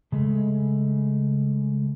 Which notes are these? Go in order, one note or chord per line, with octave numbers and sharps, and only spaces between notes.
C#3 G#3 A3